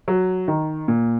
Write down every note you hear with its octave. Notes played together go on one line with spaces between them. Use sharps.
F#3
D#3
A#2